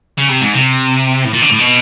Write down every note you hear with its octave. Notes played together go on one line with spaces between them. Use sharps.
C#3
C3
G#2
C3
A2
A#2
D3
A2
B2